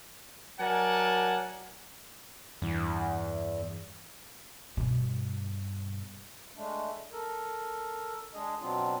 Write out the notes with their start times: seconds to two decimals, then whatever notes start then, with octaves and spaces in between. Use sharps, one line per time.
0.60 F#3 A#4 D5 F#5 G#5 A5
2.62 E2 G2 E3
4.77 G2 B2
6.56 G#3 A3 D4
7.12 A4 A#4
8.34 G#3 D4 G#4 D#5
8.61 B2 F#3 C4 D4 F4